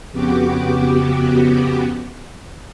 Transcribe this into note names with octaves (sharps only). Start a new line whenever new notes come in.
F2 C#3 B3 F#4 G4 D6